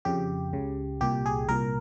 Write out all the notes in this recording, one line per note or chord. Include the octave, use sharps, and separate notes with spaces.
F2 C#3 G4
C#2 C#3
C2 A#2 G4
G#4
C2 A#2 A#4